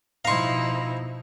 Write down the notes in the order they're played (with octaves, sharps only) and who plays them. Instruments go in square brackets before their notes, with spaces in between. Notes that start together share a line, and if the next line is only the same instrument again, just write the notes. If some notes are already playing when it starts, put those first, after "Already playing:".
[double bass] B2 F3 [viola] D#4 E4 [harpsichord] F5 C#6 [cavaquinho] A#5 C6